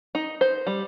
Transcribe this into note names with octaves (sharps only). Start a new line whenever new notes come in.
D#4
C5
G3